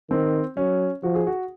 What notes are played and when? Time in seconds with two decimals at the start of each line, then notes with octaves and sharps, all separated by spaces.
0.10 D#3 C4
0.57 F#3 C#4
1.03 F3 F#4
1.15 G#4
1.27 F#4